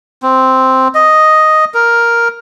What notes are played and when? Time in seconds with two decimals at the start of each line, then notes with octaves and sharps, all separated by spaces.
0.23 C4
0.95 D#5
1.74 A#4